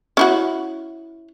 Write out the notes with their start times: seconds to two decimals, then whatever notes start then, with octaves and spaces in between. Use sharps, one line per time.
0.17 C#4 E4 F#4